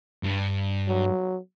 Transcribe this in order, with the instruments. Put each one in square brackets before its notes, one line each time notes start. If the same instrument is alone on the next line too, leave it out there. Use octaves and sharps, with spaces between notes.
[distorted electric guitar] G2
[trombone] F#3